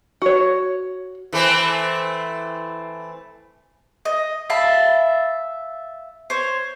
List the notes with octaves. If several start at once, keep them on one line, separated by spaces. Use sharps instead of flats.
F#4 C#5
E3 A3 C4
D#5
E5 F5 A5 B5
C5 C#5